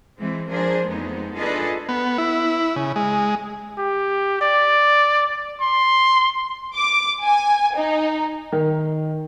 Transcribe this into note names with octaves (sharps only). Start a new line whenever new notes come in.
E3 G#3 C4
F3 D4 G#4 A#4 C5
F2 G#3 A3 B3 D#4
D4 F4 G#4 A4 B4 D#5
B3
E4
C#3
G#3
G4
D5
C6
D6
G#5
D#4
D#3